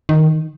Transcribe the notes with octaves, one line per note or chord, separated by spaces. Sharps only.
D#3